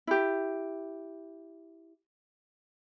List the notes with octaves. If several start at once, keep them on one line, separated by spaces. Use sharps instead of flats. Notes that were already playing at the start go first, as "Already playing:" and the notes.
E4 G4